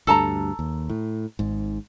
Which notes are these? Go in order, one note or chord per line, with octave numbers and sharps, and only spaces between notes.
D2 G2 A4 A5 A#5
D#2
A2
G#1 G#2